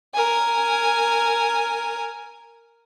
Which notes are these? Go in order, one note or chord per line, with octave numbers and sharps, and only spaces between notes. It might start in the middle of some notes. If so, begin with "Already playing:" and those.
A#4 G#5